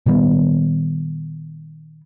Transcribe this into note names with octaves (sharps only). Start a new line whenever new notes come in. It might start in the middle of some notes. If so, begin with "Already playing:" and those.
A#2 D#3 G3 B3